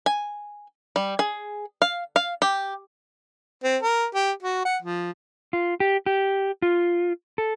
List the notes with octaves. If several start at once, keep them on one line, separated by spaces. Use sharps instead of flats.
G#5
G3
G#4
F5
F5
G4
C4
A#4
G4
F#4
F#5
F3
F4
G4
G4
F4
A4